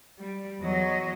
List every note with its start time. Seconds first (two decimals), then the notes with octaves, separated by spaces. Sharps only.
0.19 G3
0.61 E2 F#3 D#5